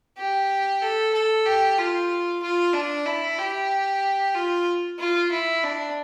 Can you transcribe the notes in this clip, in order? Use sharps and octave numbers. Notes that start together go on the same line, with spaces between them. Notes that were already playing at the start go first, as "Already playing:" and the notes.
G4
A4
A4
G4
F4
F4
D4
E4
G4
F4
F4
E4
D4